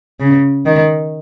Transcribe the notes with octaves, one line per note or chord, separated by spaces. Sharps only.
C#3
D#3